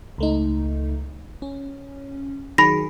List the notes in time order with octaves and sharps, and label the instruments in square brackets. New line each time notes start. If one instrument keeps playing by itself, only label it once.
[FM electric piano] C#2 A3 D#4
C#4
[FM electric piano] D#3 F#3 G#4 [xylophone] B5 A#6